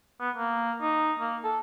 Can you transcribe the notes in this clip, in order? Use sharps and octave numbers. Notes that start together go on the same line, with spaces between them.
B3
A#3
D#4
A#3
A4